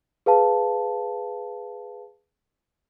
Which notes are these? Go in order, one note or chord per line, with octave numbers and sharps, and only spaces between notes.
G#4 B4 F5 A5